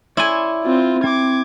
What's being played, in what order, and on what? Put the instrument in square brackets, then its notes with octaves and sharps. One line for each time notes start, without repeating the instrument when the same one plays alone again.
[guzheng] E4 G#5 [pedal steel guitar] C#5 D5 C6
[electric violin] C4 F4
[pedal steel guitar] C4 [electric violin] D6 G#6